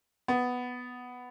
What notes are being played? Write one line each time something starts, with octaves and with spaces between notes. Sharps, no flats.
B3